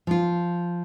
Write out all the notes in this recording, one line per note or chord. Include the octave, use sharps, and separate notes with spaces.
F3 F4